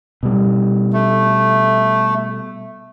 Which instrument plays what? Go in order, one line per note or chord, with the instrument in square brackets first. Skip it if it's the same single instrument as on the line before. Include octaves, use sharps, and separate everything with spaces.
[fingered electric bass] B2 G3
[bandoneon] A3